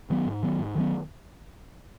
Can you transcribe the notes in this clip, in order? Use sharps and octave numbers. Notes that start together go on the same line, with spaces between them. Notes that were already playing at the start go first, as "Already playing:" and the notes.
D#3 F#3 B3
G#2
D#3 F#3 B3
G#2
D#3 F#3 B3